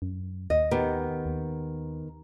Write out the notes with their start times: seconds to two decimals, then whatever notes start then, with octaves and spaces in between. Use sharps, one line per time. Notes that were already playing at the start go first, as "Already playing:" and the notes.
0.02 F#2
0.50 D#2 D#5
0.71 D#3 B3 G4
1.26 D#2